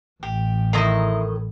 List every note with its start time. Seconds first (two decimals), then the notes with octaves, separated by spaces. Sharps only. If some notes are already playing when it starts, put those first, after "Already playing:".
0.23 A1 G4
0.73 A2 D#3 E4 D#5 A#5 C6